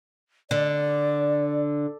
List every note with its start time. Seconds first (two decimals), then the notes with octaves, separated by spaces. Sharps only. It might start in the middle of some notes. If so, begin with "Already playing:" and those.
0.51 D3 D5